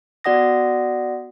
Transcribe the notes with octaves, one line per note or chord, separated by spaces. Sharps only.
B3 F#4 D5 F#5 D#6 A#6